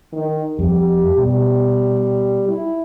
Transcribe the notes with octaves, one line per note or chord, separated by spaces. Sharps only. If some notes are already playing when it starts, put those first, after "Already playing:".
D#3
F2 G3 G4
B2 G3
E4